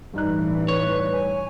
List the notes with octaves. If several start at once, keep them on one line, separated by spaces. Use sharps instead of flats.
A1 G2 E3 D#4 F#6
B4 C#5
G#5